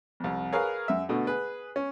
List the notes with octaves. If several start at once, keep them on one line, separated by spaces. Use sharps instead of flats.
C2 F2
G#4 A#4 B4 C#5 F5
F#2 E5
B2 D3 A3
G#4 B4
C#4